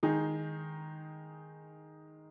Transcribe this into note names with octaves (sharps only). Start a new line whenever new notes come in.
D#3 G#3 D#4 G#4